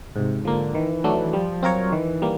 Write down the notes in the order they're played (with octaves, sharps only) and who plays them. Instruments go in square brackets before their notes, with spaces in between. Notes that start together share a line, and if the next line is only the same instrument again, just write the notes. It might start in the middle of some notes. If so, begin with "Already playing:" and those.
[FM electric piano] G#2 [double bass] C3
[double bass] D3 [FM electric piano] F3 A#3
[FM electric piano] D#3 [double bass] E3
[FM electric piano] F#3 A3 D4
[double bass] F3 [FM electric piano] G3
[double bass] F#3 [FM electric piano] C4 F4 A#4 C#5
[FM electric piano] D#3 [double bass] E3
[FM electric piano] G3 A#3